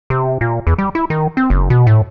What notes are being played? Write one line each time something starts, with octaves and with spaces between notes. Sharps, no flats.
C3
A#2
E2
G3
E4
D#3
C4
F#1
B2
A2